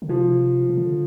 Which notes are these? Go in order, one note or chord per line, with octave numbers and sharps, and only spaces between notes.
D3
C3 F3
C3
D3